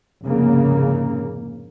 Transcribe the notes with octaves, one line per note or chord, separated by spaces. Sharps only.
F1 G#2 C#3 A#3